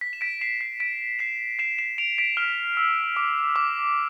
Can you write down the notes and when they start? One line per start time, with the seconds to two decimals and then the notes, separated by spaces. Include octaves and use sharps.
0.01 B6
0.13 E7
0.21 B6 D7
0.41 C7 E7
0.61 C7
0.80 B6 D7
1.19 C7 E7
1.59 C7 E7
1.78 C7 E7
1.98 D7 F7
2.18 B6 D7
2.37 F6
2.77 E6
3.16 D6
3.56 D6